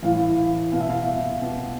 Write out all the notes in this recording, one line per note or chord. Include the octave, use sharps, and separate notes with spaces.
A2 E3 F5
B2 F5
E5
F5
B2